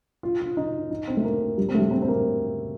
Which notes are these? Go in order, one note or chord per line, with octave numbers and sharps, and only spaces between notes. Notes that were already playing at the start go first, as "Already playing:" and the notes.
F4
F4
D#4
D#4
C4
A3
A#3
G3
C4
A3
G3
C4
C4
A#3